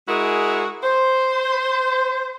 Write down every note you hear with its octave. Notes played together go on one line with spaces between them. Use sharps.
G#3 E4 F#4 G#4 A#4
C5